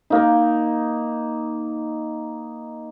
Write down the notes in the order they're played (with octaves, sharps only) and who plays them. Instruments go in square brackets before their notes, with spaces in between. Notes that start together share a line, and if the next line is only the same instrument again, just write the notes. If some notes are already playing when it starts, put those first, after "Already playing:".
[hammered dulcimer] A#3 D#4